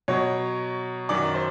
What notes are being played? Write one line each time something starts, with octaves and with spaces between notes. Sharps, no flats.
B2 F#3 C#5
F#2 D#3 F#3 D5
C5